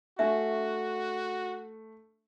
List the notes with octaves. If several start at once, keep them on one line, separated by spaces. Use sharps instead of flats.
A3 D4 F#4 E5